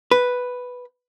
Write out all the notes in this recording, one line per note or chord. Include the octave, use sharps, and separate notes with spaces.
B4